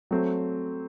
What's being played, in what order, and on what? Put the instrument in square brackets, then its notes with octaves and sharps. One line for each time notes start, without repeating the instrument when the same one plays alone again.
[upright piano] F#3 A3 C4